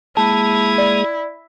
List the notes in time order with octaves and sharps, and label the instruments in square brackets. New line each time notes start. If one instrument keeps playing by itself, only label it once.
[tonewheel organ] G#3 A#3 G#4 [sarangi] E4 [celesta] A5
[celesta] D5